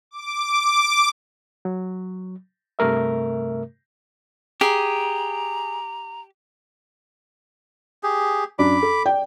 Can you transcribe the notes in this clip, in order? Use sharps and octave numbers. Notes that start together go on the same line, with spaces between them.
D6
F#3
G2 C3 A3 A#4 E5
G4 G#4 A#5
G4 G#4
F#2 D4 B5 D6
A4
D5 G5